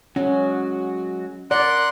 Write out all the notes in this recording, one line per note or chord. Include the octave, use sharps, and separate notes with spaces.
F#3 G#3 C#4 F#4
A#4 D5 F#5 C6 F#6